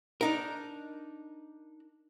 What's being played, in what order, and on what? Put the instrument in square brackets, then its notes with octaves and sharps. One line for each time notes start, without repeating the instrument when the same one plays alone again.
[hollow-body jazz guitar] D4 D#4 A#4